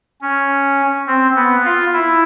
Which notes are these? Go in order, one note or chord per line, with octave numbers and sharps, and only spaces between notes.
C#4
C4
B3
F4
E4